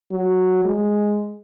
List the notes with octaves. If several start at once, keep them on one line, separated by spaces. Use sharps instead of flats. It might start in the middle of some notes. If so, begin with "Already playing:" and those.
F#3
G#3